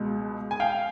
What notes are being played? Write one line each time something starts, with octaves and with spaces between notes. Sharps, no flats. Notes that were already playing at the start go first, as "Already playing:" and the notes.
Already playing: C#2 B2 G#3
G#5
F5 G5